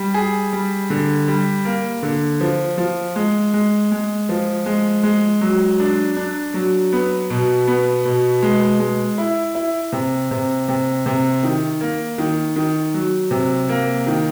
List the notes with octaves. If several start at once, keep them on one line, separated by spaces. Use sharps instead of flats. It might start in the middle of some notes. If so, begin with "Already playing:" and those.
Already playing: G3
G#4
G3
D3
G3
A#3
D3
F3
F3
G#3
G#3
G#3
F3
G#3
G#3
F#3
D4
D4
F#3
B3
B2
B3
B2
G#3
G#3
E4
E4
C3
C3
C3
C3
D#3
A#3
D#3
D#3
F#3
C3
A#3
D#3